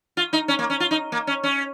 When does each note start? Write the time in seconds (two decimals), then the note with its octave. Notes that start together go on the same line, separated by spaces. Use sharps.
0.17 F4
0.33 D#4
0.48 C#4
0.59 A#3
0.70 C#4
0.80 F4
0.91 D#4
1.12 A#3
1.27 C#4
1.43 C#4